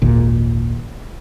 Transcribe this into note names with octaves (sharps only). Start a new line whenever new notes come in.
G#1 D#2 A#2